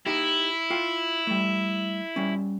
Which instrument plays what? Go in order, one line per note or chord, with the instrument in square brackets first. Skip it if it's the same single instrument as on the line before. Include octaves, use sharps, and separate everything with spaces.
[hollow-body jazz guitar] D#4 G4 [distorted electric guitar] E4
[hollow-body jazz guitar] F4 G5
G3 A3
G3 C#4